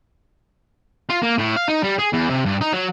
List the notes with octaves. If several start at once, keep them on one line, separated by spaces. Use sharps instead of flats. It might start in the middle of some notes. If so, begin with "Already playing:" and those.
F4
A#3
A2
F5
D#4
G3
G#4
E2
C3
G2
D#4
F#3